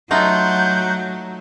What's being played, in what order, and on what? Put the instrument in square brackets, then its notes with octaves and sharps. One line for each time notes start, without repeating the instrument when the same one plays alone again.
[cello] F#3 [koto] A3 D#4 F4 [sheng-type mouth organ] F#5 [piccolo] G6